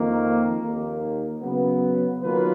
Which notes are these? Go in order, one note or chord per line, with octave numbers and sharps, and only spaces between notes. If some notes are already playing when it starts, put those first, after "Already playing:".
Already playing: F2 D#3 A#3
D#2 D#3 A#3
C#3 F#3 B3
D#3 F#3 A#3 F4 B4